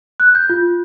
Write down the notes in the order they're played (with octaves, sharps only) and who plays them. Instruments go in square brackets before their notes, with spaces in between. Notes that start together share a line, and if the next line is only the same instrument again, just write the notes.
[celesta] F#6
G6
F4